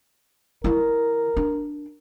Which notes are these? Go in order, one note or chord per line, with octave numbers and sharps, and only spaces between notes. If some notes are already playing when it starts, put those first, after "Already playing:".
D#3 E4 A#4
D4